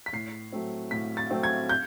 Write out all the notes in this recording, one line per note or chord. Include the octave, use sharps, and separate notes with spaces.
B6
A2 C7
F#3 A3 C4
A2 B6
A6
F#3 A3 C4
G#6
G6